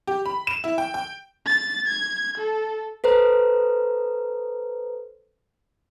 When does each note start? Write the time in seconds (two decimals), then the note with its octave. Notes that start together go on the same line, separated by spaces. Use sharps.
0.07 G4
0.26 B5
0.47 E7
0.64 E4
0.78 G5
0.94 G5
1.46 A6
1.87 G#6
2.38 A4
3.04 A4 B4 C5 A#5